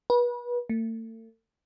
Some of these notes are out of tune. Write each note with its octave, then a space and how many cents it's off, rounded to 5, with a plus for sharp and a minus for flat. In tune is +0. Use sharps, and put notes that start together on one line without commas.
B4 -30
A3 +40